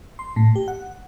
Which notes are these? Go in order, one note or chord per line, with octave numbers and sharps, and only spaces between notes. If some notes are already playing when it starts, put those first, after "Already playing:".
C6
A2
G4
F#5